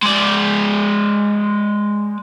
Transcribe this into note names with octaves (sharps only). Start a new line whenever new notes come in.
G#3 D5